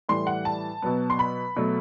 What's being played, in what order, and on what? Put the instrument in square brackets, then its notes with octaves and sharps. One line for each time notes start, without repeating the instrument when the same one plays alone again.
[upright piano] A2 E3 G3 C6
F#5
A5
B2 F#3 B3
C6
B5
B2 F#3 A3